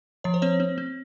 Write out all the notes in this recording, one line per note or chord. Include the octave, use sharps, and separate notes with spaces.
F3 C#5
C5
C4 C#5
C4
C4